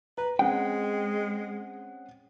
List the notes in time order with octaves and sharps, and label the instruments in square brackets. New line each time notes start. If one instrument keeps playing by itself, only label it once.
[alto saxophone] B4 [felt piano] A#5
[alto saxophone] G#3 [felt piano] C4 C#4 F#5 [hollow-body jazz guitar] G5